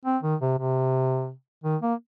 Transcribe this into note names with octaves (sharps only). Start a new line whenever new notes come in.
C4
D#3
C3
C3
D#3
A#3